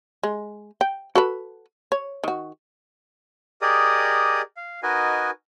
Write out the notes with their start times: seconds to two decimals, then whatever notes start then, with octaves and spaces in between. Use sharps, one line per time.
0.23 G#3
0.81 G5
1.15 F#4 A4 B4
1.92 C#5
2.24 D#3 F#4
3.62 G4 G#4 A#4 D5 D#5 D#6
4.57 F5
4.83 D#4 F#4 A#4 B4 D#5 G#5